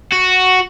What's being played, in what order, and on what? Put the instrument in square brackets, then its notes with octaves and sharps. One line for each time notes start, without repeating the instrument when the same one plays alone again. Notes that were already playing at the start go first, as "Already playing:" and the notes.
[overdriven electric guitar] F#4